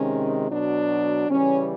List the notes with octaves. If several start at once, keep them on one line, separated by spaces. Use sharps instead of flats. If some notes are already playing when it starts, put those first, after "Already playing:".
Already playing: C3 D#3 G#3 C#4
B2 F#3 D4
C#3 E3 G3 C#4